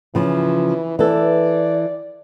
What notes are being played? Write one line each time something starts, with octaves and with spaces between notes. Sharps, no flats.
C#3 E3 F3
E3 A4 D5